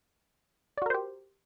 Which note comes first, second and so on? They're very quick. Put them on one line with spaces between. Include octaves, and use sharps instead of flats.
D5 F#4 A#4 C5 G4